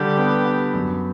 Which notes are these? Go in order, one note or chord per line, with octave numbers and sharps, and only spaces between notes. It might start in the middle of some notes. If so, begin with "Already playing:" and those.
Already playing: D3 G3 G4
B3
B3
F#2